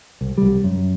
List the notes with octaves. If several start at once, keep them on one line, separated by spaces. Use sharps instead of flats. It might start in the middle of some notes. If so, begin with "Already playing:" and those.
C2
C2 G3
F#2